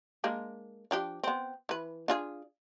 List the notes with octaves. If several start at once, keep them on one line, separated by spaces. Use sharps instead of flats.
G#3 A#3 D4
F3 D4 G4
B3 C4
E3 B4
D4 F4 G#4